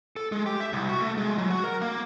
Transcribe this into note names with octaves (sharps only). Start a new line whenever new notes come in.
A4
G#3
G4
E5
C2
F#4
A3
G#3
F#3
F#4
A#4
A#3